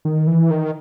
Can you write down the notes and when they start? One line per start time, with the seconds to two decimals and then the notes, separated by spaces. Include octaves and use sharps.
0.05 D#3
0.27 E3
0.50 D#3